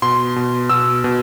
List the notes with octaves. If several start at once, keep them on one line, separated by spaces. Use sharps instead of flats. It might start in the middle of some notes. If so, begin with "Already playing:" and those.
B2 C6
B2
B2 E6
B2